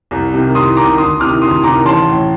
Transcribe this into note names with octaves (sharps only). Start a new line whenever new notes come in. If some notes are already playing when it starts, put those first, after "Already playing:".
C2
C3 D#3
C2 C6 D#6
C3 D#3 A#5 D6
D2 C6 D#6
C3 D#3 D6 F6
D2 C6 D#6
C3 D#3 A#5 D6
A1 A5 C6
A2